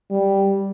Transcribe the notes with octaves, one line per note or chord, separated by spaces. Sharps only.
G3